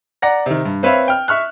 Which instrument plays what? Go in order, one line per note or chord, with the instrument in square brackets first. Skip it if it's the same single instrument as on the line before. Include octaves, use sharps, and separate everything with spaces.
[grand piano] D5 F#5 A#5 A#6
C3 D#3
G2
C4 B4 C#5 E5 F5
G5 F6
E5 C#6 F6 F#6